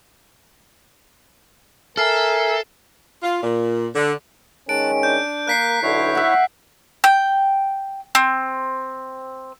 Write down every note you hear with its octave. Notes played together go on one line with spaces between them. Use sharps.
A4 A#4 E5 G#5 F6 C7
F4
A#2
D3
D#3 G#3 C#4 A5 F#6 D7
D4 G6
A#3 A#4 F#6 B6 C7
B1 D3 E4 C#5
E5 F#5
G5
C4